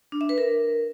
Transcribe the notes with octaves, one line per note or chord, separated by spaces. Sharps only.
D4
E5
B4
A#4